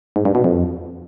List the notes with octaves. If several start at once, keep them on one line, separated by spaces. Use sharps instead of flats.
G#2
G2
B2
F2